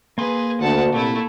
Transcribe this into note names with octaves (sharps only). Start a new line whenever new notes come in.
A#3 G#4 B4 C6
D2 F#5 A5
C2 A#2 A3 E4